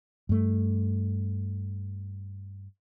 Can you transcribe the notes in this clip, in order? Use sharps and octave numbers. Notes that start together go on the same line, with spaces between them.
G2 A3